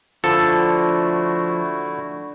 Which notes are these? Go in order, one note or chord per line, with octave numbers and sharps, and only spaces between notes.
D3 F3 A3 E4 F#4 A4